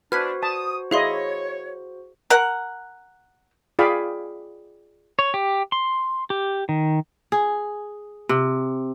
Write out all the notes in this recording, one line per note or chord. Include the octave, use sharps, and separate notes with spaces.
D4 F#4 B4 C5 F6 G#6 B6
A5 D#6
E4 G#4 C#5 D#5 F5 C6
A#4 F#5
F4 G#4 D5 F5 G5 B5
C#5
G4
C6
G4
D#3
G#4
C3